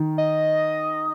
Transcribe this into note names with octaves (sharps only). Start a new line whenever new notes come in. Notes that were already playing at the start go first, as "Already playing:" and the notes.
Already playing: D#3
D#5